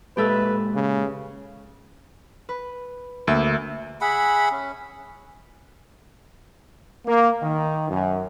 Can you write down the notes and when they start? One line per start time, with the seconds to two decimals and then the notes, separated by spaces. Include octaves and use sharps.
0.17 A#2 G#3 G4 A4 B4 E5 E6
0.75 C#3
2.49 B4
3.27 D2 A#3 E5 E6
4.01 G#4 E5 F#5 B5
4.51 C#4
7.06 A#3
7.43 D#3
7.90 F#2